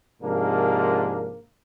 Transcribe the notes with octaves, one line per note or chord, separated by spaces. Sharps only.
G#2 C3 F3 A#3 D4 A#4